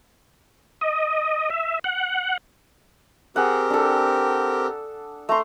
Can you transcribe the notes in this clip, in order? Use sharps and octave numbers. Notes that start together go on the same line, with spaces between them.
D#5
E5
F#5
C4 G4 G#4 A#4 F#5
D4 A4
A3 A#5 C6